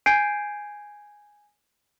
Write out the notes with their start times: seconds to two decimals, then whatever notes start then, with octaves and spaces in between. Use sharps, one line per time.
0.06 G#5 G6 G#6 C7 D7 D#7